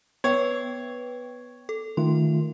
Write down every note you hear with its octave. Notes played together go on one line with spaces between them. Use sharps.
B3 B4 C#5 G5
A4
D#3 A3 F4 C6